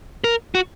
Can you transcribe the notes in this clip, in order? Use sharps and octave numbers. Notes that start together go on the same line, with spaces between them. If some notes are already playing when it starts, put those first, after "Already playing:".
A#4
F#4